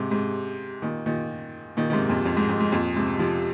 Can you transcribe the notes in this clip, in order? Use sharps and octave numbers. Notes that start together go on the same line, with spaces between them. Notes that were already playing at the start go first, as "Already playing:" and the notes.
Already playing: G#2 C3
G#2 C3
A#2 D#3
A#2 D#3
A#2 D#3
D#3
G#2 C3
F2 A#2
F2
G#2
F2
G#2
F2 A#2
G#2 C3
C3 F3